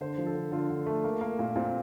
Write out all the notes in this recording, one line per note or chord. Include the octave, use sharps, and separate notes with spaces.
D3 C5
F3
A4
D3
D3 F4
D3
A3
A#3
A#3
A#2
A#2 C4